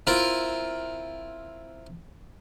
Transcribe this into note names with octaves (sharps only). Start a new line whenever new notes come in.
C4 E4 F4 A#4